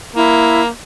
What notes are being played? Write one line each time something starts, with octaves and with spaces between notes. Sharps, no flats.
A#3 E4